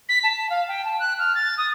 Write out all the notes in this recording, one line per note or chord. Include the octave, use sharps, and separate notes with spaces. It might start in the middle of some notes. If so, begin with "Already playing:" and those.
B6
A5
F5
G5
A5
F#6
F6
A6
D#6